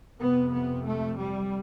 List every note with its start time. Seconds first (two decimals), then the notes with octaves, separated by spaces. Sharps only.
0.21 F2 C3 B3
0.54 B3
0.87 A3
1.20 G3